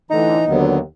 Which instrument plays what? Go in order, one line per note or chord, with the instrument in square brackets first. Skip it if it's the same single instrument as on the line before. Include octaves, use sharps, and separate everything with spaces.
[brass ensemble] A2 D3 [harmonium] E3 A#5 [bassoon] D#4
[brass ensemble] D#2 [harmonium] D3 F#3 B3